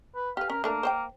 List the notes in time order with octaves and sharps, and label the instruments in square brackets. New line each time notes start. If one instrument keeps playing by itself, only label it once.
[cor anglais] B4
[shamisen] G4 B4 [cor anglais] F5
[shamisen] C#4 [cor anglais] A#4
[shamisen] A3 D4 A#4 [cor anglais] A#3
[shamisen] C5 C#5 G5